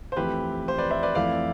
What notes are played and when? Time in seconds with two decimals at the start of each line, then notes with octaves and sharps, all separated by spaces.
0.12 C5
0.17 F2 E3 A3 C4 G4 B4
0.68 C5
0.78 B4 D5
0.90 C5 E5
1.03 B4 D5
1.15 F2 E3 A3 C4 E4 D5 F5